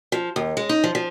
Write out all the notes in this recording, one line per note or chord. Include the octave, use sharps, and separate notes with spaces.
F3
D#2
G#3
D#4
F3
F3